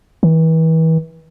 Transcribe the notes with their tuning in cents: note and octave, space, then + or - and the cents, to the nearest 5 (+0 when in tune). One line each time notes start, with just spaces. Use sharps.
E3 -35